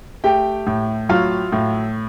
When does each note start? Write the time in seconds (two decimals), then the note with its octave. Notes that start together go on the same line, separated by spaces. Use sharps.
0.24 A3 G4 G5
0.67 A2
1.09 F#3 F4 F5
1.52 A2